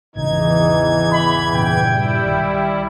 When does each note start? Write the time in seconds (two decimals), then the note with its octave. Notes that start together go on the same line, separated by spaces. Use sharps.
0.16 G#1 E2 C#3 E3 D#4 G#6
1.12 B5
1.54 G2 A#2 C#3 G5
1.84 G3 E4
2.24 B1 D#3